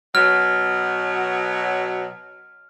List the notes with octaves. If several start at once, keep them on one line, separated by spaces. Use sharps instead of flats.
B2 F#3 F6